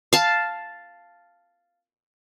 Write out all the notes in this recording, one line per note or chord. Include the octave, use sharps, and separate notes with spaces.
F5 A5